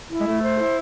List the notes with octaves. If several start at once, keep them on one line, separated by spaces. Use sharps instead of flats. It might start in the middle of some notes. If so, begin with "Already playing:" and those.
E4
G#3
A3 A4
C5
E4